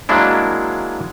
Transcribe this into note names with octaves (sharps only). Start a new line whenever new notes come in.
F#3 G#3 A#3 D4 E4